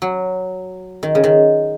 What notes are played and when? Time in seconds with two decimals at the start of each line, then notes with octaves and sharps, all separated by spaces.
0.02 F#3
1.03 D#3
1.15 C#3
1.24 D#3